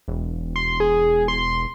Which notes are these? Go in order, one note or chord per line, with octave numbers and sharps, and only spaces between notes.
E1
C6
G#4
C6